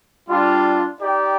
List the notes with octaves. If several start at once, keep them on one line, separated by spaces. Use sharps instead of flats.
G3 D4 F4
D#4 G4 D5 G5